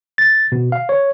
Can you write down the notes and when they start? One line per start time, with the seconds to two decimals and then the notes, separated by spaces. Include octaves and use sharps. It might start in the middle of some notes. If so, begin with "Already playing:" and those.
0.18 A6
0.52 B2
0.72 F5
0.89 C#5